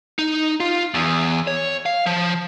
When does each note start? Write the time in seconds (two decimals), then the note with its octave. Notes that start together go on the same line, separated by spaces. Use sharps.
0.19 D#4
0.60 F4
0.94 E2
1.47 C#5
1.86 F5
2.06 F3